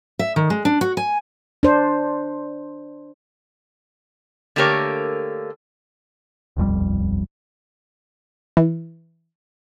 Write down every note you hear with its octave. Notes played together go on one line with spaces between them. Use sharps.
E5
D#3
G#3
D4
F#4
G#5
D4 C5
D3 A3 A#3 G4 A#4 C#5
D#1 B1 F2 G3
E3